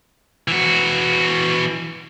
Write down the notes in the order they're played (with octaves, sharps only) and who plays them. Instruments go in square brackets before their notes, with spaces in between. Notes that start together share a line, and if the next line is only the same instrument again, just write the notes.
[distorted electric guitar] E3 F#4